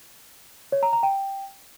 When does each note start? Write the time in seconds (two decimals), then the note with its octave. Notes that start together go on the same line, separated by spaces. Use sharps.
0.72 C#5
0.83 A#5
0.93 A#5
1.03 G5